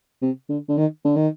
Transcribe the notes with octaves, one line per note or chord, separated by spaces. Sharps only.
C3
D3
D3
D#3
D3
D#3